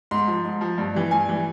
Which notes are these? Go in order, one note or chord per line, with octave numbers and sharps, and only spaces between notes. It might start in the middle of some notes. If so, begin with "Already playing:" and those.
G#2 C6
F3
G#2
F3
G2
E3 G3
G2 G#5
E3 G3